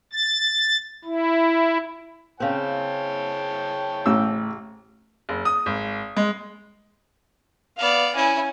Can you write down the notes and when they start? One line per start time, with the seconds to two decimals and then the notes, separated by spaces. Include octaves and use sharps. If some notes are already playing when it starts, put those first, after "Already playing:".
0.13 A6
1.05 E4
2.40 C#3 C4 C#5 G5 A5
4.06 A1 E6
5.29 F#1
5.45 D#6
5.66 G#1
6.17 G#3
7.79 B3 D5 F5
8.15 C#4 E4 G#5